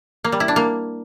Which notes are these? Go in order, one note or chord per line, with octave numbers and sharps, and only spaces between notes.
A#3
G3
E4
D4
A#3